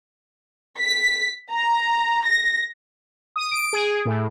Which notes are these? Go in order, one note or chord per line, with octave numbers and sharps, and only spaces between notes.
B6
A#5
A#6
D#6
D7
G#4
A2